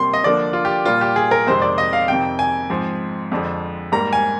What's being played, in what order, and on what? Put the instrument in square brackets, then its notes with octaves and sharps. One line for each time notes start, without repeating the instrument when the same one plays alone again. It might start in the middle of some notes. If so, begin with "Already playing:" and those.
Already playing: [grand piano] C3 G3 A#3 C6
D#5
D3 F3 A#3 D4 D5
F4
G4
A#2 G3 A#3 F4
G4
G#4
A#4
F2 C3 D#3 G#3 C4 C5
D5
D#5
F5
F2 C3 D#3 G5
G#5
G#2 F3 C4
F2 D3 F3 G#3
G#2 G3 A#3 A#5
G#5